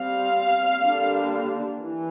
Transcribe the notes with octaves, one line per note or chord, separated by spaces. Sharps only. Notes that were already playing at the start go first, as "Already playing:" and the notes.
Already playing: G3 C4 F5
D3 G3 A#3 D4
E3